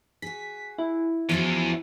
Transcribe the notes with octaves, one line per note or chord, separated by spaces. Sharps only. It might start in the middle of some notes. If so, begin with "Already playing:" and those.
F#4 G#4 B6
E4
E2 F3 C#4 F#4